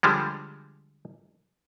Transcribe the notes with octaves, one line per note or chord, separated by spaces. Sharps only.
D3 F3 G3 G#3